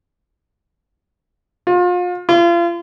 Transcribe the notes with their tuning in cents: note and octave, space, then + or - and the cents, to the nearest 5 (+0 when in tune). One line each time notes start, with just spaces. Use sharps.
F4 +35
F4 -35